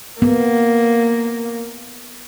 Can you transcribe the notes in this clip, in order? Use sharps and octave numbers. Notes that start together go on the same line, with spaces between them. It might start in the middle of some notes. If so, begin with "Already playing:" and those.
A#3 B3